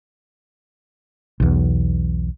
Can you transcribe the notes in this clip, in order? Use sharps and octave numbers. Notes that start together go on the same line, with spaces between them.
B1 E2